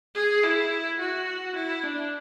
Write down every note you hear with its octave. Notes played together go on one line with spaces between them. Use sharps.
G#4
E4
F#4
E4
D4